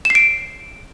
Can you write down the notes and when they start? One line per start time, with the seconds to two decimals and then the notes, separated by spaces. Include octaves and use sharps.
0.05 E7
0.10 C7
0.15 D7